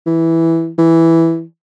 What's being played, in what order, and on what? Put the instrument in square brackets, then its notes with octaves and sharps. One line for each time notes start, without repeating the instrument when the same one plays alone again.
[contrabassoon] E3
E3